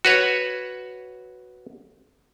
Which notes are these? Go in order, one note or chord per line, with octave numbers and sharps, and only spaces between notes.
F#4 B4 C#5